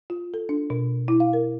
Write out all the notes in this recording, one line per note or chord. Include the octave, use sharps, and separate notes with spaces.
F4
A4
D4
B2
E4
F5
A#4